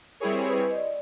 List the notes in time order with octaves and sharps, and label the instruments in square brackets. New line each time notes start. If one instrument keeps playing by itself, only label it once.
[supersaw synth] G3 C4 E4 G#4 C#5 [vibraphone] A#4
[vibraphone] B4
D#5
D5